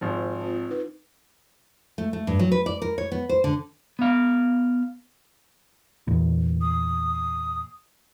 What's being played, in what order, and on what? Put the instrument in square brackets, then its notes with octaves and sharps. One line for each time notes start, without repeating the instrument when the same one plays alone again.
[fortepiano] G#1 F3
[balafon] C4 F4
D#4 B4
[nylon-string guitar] A3
A3
G2
F#3
B4
D5
A#4
C#5
B3
C5
D3
[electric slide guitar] B3 F5
[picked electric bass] E2 A#2
[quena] D#6